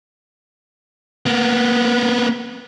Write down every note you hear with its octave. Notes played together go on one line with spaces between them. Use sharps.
A#3 B3